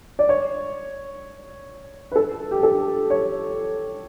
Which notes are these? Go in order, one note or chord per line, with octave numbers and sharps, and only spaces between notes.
D5
C#5
B4
A4
G4
A4
C#5